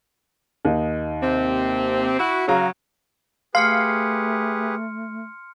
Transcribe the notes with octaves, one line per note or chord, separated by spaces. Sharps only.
D#2 D#4
C3 C4
E4 F#4
C#3 F#3 F#4 F5 A#5
A3 G4 G#4 B4 F5 C6 F6 C#7